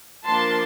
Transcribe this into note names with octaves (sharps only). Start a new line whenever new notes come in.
F3 A#3 D4 A5 C6